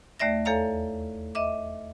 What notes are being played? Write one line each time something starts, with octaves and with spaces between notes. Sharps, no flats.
D#2 A3 D5 E5 A#6
E2 A4 C#5 F5 A#5
D#5 E5 D6